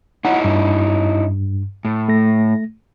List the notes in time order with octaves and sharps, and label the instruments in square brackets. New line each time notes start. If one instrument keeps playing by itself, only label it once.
[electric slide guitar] C#4 D#4 E4 [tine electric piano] F#5
[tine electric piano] G2
[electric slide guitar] A2
[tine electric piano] A3 A#6